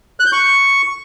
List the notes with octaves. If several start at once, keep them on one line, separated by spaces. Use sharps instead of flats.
F#6
G6
C#6